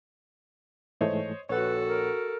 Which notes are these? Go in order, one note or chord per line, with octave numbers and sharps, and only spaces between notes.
G#2 E3 A3 C5 C#5 D#5
A#1 F#4 A4 B4 C#5 F#5
A#4